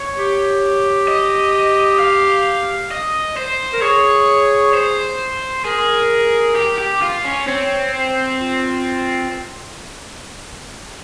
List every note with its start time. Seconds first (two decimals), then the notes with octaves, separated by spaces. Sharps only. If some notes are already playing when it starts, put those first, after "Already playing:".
Already playing: C#5
0.17 G4
1.08 D#5
2.00 F5
2.91 D#5
3.37 C5
3.73 A#4
3.81 G#4 C#5
4.74 C5
5.65 G#4 A#4
6.56 G4
6.79 G4
7.02 F4
7.24 C#4
7.47 C4 C#5
7.93 C5
8.38 F4